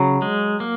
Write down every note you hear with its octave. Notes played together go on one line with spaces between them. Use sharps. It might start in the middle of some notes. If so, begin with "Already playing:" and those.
Already playing: C#3 F#3
G#3
A#3